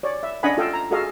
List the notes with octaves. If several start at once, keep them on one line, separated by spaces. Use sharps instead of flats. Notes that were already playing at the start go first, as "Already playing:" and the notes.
C#5 D5
E5
C#4 D4 D#5 F#5 G#5 B5
F4 A4 D#5 F5 G5
A#5
F#4 G#4 A4 D#5 F5